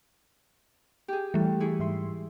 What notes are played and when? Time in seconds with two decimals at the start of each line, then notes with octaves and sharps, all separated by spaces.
1.08 G4 G#4
1.34 E3 G3 A3
1.60 E4 G#4 C#6
1.79 G#2 E5 C6